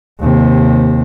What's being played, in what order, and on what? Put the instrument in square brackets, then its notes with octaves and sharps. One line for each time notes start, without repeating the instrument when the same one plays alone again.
[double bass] D#2 C3